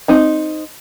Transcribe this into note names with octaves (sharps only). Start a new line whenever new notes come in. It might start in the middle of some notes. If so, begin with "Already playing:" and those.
C4 D#4 A#5